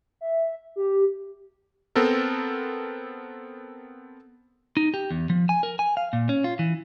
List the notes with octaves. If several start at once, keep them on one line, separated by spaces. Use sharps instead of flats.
E5
G4
B3 C4 A4 A#4
D#4
G4
E2
F3
G#5
A#4
G#5
F5
A#2
C#4
F4
E3